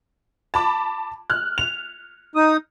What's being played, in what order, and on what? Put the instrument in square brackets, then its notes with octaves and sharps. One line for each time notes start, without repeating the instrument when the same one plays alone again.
[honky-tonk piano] A5 B5 D6
F6 F#6
F7
[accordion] D#4 D#6